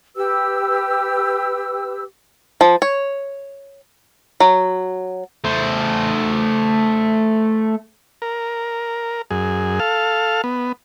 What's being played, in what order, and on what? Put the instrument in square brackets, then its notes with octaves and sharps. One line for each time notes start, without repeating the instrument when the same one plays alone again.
[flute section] G4 B4 E6
[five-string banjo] F3
C#5
F#3
[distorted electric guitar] A3 C5
[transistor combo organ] A#4
F#2 G#4
A4 F5
B3